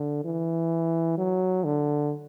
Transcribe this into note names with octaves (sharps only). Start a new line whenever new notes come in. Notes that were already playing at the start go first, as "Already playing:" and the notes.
Already playing: D3
E3
F#3
D3